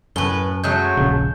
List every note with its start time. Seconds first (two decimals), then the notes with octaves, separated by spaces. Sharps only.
0.16 F#2 A2 B4 G#5 G7
0.64 F#3 G#3 A3 F#6 G6
0.97 D#1 A#1 C#3